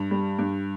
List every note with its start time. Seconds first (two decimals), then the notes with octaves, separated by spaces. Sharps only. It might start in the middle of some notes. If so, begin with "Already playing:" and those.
Already playing: G2
0.11 G3
0.39 G2